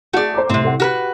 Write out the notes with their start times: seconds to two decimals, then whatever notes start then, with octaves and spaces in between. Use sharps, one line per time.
0.13 A3 F#4 G#4 D5
0.34 C5 A#5 D6
0.49 C2 A2 C3 C4
0.62 C2 A4 F#5
0.80 F#4 G4 A#4 B4